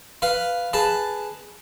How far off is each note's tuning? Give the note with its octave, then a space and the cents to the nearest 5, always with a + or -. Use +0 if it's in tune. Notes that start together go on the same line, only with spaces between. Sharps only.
B4 +0 F5 +0
G#4 +0 B4 +0 A5 +0